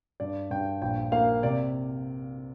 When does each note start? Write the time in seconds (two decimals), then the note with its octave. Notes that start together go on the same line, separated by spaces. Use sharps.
0.20 G2 D5
0.51 G2 G5
0.82 A#1 G5
1.12 A#3 F5
1.43 C3 D5